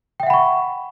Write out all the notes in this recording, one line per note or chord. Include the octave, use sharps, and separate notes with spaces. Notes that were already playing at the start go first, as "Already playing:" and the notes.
E5 F#5 G5 B5 C#6